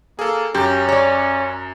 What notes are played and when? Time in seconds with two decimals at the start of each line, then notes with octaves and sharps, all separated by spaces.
0.19 A#3 G#4 A4
0.54 F#2 C#4 G4 A#5
0.89 C#5 D5